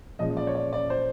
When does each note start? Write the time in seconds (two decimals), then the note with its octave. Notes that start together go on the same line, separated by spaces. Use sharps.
0.19 A#2 F3 G#3 C#4 D#5
0.37 D5
0.47 C#5
0.55 D5
0.73 D5
0.90 C5